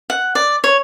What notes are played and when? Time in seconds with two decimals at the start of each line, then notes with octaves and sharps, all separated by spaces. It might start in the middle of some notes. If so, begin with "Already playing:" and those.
0.10 F#5
0.35 D5
0.64 C#5